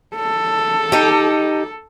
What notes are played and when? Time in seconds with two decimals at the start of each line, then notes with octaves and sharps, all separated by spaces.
0.16 A4
0.92 D#4 G4